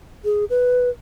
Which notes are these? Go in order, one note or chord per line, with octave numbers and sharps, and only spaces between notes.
G#4
B4